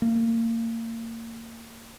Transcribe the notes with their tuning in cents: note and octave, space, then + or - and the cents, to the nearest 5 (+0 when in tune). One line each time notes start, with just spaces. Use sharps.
A#3 -30